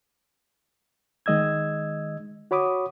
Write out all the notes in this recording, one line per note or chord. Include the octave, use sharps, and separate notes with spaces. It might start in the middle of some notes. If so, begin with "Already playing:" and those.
D#3 G#3 D#5 E6 G#6
F#4 C#5 B5 D6 D#6